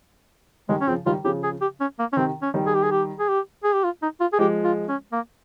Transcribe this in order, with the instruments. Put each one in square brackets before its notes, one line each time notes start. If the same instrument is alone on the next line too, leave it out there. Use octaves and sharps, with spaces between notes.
[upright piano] D#3 G3 [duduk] G#3
[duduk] C#4
[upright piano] C#3 F3 [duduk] C4
[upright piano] D#3 G3 [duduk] F4
[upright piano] C#3 F3 [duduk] G4
[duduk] G#4
G4
C#4
A#3
C#4
[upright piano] C3 D#3 [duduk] C4
[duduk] C#4
[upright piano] D#3 G3
[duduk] G#4
G4
G#4
G4
G#4
G4
G#4
G4
F4
D#4
F4
G#4
[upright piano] F3 G#3 [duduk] G4
[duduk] F4
C#4
A#3